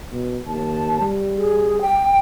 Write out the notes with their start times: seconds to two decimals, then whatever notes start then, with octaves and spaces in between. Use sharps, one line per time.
0.12 B2
0.46 D#2 A5
1.00 G3
1.36 G#4
1.81 G5